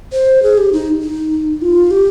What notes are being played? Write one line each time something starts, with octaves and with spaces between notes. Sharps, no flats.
C5
G#4
G4
D#4
D#4
F4
G4